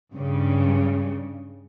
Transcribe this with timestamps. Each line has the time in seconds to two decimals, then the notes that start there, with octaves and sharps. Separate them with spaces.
0.13 G2 C#3